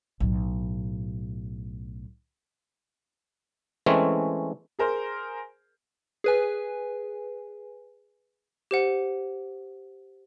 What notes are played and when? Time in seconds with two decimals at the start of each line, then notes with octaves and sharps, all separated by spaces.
0.20 B1 A2
3.86 E3 G#3 A3 C4 C#4
4.79 G#4 A#4 C5
6.24 G#4 B4 G#5
8.71 G4 C5 F#5